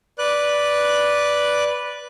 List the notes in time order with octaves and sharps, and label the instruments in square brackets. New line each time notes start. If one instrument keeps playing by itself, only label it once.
[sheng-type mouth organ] B4 D5 F#6